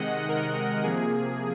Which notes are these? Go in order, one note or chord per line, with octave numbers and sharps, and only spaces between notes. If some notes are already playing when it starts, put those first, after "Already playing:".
Already playing: C3 D#3 G#3 D#5 F#5
A#4
C3 F3 A#3 G#4